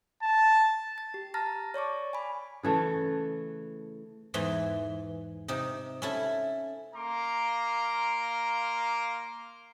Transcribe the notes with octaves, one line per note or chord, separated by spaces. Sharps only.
A5
A6
G4
A5 A#5 F6 A6 A#6
C#5 D5 C#6 D6
G#5 B5
C#3 E3 A3
E2 G#2 E3 C6
C3 D#4
C#4 E4 A4
A#3 F5 A#5 C6 D6